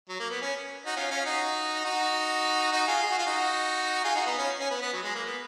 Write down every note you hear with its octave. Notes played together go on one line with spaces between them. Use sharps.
F#3
A#3
B3
C#4
D#4 F#4
C#4 F4
C#4 F4
D#4 F#4
D#4 F#4
D#4 F#4
F4 G#4
G#4
F#4
F4
D#4 F#4
F4 G#4
D#4 F#4
B3 D#4
C#4 F4
C#4
B3
B3
F#3
G#3
A#3
B3